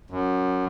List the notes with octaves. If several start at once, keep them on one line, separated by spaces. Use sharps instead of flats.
F#2